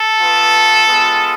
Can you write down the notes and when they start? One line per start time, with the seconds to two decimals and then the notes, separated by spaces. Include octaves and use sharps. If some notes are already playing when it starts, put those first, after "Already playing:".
Already playing: A4
0.21 B3 F4
0.86 G#3 B3 F4